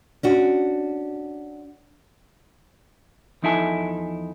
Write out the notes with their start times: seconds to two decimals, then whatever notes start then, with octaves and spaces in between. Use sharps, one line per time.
0.23 C#4 D4 F#4
3.42 E2 F3 D#4 E4 A4 G#5